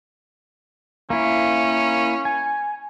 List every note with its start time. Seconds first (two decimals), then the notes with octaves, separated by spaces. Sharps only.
1.10 A#3 C#4 E4
2.25 G#5